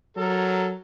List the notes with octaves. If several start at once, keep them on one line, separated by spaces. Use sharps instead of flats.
F#3 A4 A#4